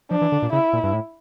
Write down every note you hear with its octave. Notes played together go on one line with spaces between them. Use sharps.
F3 D4
E3
D3
A#2
C#3 E4
A#2
G2
A2